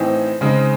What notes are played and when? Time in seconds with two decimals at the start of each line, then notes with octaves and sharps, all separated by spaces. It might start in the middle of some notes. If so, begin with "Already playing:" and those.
Already playing: A2 E3 C4 D#4
0.41 C#3 G#3 C4 D#4